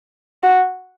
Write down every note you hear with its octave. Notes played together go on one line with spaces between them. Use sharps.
F#4